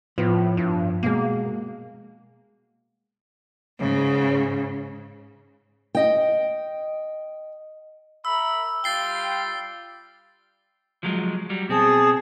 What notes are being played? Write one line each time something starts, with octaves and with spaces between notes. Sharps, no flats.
A2 F3 B3
G2
B2 G#3 A#3
G#2 C#3
D#5 G5
A#4 E5 B5 E6
G3 F4 G5 A6 C7 G7
F3 F#3 G#3
F#3 G3
B2 C4 G#4 A5 D#6